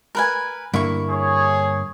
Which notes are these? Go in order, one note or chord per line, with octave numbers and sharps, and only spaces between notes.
A#4 B4 G#5
G2 D3 A#3 E4 C#6
G#4 C#5